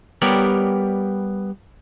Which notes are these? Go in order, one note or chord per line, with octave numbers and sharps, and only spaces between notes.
G3 B3 G4 A#4 C#5 D5